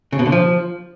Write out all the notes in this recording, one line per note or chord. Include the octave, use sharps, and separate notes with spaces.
C#3
B2
D3
F3